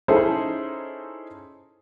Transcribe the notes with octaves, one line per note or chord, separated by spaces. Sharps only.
C#4 D#4 E4 G#4 A4 C5